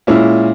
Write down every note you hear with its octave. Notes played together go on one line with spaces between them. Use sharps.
A#2 G#3 C#4 E4